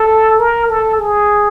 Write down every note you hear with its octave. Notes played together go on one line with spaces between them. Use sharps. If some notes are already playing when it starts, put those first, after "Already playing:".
Already playing: A4
A#4
A4
G#4